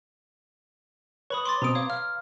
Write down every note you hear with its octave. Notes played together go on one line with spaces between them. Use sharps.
B4 C#5 B5 D#6
C6 D6 A6
B2 C4 A#5 D#6 D7
C#5 F5 D6
F5 F6